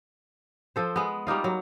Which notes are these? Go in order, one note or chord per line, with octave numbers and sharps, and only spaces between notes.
F3 A4 C5
G#3 B3
G3 A#3 D#4 F4
F#3